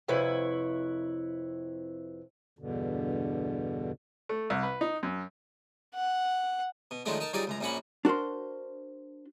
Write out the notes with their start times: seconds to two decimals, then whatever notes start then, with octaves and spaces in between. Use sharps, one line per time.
0.08 F2 C3 E4 B4 C#5
2.59 E2 G2 B2 D3
4.29 A3
4.50 C2
4.63 B4
4.81 D#4
5.03 F#2
5.95 F#5
6.91 B2
7.05 D#3 F3 F#3 G#3 A3 D4
7.20 D#4 A#4 A5
7.33 F#3 G3 D#4 F4 G#4 D5
7.47 C#2 F#2 A#5
7.60 A#1 F#2 A#3 C#4 F#5 B5
8.05 D4 F#4 A#4 C5 C6